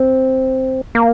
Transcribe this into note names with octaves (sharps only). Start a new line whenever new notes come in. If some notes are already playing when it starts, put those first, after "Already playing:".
Already playing: C4
A#3